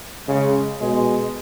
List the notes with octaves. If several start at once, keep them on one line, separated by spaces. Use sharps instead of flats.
C#3 G#3
B2 G#3